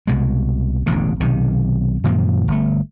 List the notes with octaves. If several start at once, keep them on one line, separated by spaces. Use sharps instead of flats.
C2 B2 G#3
E1 A1 D#2 D3
B1 C3 D#3
F#2 A#2 D#3 F3
G1 A3